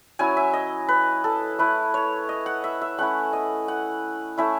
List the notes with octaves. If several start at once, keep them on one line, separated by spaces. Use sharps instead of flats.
F#3 C#4 E4 G#5
E5
D#5
B4
A4
A3 E4 B4
C#5
D#5
F#5
E5
E5
A3 C#4 E4 F#5
D#5
F#5
A3 C#4 E4 E5